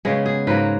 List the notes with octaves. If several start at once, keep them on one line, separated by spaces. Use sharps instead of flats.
C#3 G#3 B3 G#4
G#4
G#2 F#3 A#3 B4